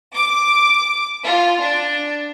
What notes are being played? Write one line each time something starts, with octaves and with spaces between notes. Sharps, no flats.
D6
F4
D4